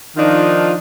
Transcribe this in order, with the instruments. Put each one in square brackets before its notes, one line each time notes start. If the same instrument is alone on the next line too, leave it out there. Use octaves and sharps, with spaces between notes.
[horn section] D#3 F3 D4 D#4 F4